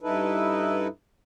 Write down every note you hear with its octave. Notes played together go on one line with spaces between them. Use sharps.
G2 D#4 E4 A4 B4